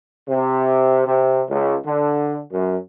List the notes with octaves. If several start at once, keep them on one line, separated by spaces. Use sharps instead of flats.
C3
C3
C#2
D3
F#2